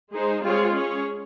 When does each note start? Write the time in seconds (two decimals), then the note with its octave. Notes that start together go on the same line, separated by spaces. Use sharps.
0.12 G#3 D#4 G#4 C5
0.44 G#3 C4 F4 G#4 C#5
0.74 C#4 G#4 C#5